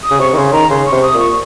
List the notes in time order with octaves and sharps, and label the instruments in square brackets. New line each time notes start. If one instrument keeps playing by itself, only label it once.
[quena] D#6
[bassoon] C#3
[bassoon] C3 [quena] C#6
[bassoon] D#3
[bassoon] C#3 [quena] C6
[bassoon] D#3 [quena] A#5
[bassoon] C#3 [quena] C6
[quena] C#6
[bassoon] C3
[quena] D#6
[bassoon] A#2
[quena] C#6